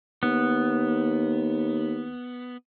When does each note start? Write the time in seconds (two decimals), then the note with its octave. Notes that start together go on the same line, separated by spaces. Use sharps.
0.23 D#2 B3